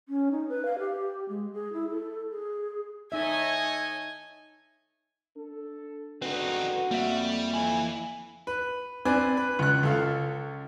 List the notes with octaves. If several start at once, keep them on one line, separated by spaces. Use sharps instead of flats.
C#4
D#4
B4
F5
G4
G#3
G#4
E4
A4
G#4
A3 D#4 C#5 D#5 E5 G#5
D4 A4
F#1 D3 C4 D#4 F#4 B4
F2 G3 A#3 E5
E3 G#5 B5
B4
C4 D4 B4 D5 G#5
B4
C#2 F#6
C#2 A4 F5